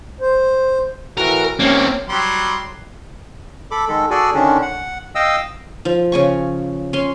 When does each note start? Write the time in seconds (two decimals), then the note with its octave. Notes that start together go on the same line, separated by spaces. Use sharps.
0.20 C5
1.17 A2 E3 F#4 A#4
1.59 C3 A#3 C4 C#4
2.09 F#3 G3 C6
3.71 A4 B5 D6
3.88 D#3 G#3 A4
4.11 F#4 G#4 A4 D5 G#5
4.34 D3 D#3 C#4 D4
4.62 F#5
5.15 D#5 F5 G5 D#6 E6
5.85 F3
6.12 C#3 G#5 C#6
6.93 C#4 C6